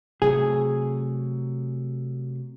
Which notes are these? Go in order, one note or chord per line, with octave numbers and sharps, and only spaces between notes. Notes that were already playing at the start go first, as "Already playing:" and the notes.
C3 F#3 A3 G#4